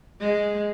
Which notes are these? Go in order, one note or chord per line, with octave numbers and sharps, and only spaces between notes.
G#3